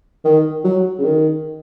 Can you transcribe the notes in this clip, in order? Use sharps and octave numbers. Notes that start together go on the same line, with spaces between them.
D#3
F#3
C#3
D#3